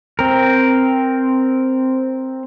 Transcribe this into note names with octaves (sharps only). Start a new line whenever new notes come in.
C4 A#4